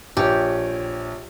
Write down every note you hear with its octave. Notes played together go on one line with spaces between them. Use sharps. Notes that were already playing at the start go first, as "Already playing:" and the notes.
A#1 G4 C#5